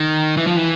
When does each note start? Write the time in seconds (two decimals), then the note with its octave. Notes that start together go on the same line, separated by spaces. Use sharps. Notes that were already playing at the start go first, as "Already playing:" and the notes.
Already playing: D#3
0.37 E3
0.47 F3
0.56 E3